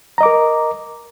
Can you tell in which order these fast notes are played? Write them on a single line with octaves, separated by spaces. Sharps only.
A#5 D#5 D6 A#4